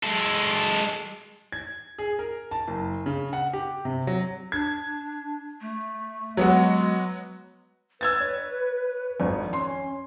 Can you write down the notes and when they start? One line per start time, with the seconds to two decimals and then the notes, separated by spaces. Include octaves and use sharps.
0.04 G#3 A4
1.52 G#6
1.99 G#4
2.19 A#4
2.51 A5
2.68 F#1
3.06 C#3
3.33 F#5
3.53 G4
3.85 C3
4.07 F#3
4.52 D4 G#6
5.61 A3
6.37 F#3 G#3 B3 F#4
8.01 B4 E6 G#6 A6
8.20 C#5
9.20 G#1 F2
9.53 C#4 C6